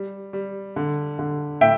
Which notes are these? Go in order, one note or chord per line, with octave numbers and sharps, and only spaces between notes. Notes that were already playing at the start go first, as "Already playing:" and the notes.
Already playing: G3
G3
D3
D3
A2 E5 G5